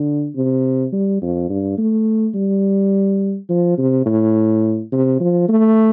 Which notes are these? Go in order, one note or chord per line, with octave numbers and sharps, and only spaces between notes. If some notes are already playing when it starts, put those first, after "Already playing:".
Already playing: D3
C3
G3
F2
G2
A3
G3
F3
C3
A2
C3
F3
A3